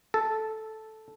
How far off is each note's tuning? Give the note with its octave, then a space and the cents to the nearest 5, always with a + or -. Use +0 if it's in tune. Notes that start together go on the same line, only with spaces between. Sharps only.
A4 -5